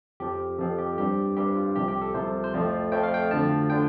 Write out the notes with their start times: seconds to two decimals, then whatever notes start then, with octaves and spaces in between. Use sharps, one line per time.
0.20 F2 F3 C4 G4
0.59 F2 F3 C4 A4
0.78 G4
0.98 G2 G3 C4 G4
1.37 G2 G3 C4 G4
1.56 F4
1.76 C2 C3 F3 G4
1.89 G4
2.02 A4
2.14 C2 C3 F3 C5
2.44 C5
2.53 F2 F3 A3 C4 D5
2.92 F2 F3 A3 C4 G5
3.03 F5
3.14 G5
3.31 D2 D3 F3 A5
3.70 D3 G5